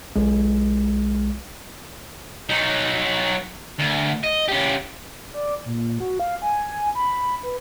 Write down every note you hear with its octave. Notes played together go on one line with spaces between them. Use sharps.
B1 G#3
F#3 D#4
D2
D#5
C#3 G4
D5
A#2
F#4
F5
G#5
G#5
B5
B4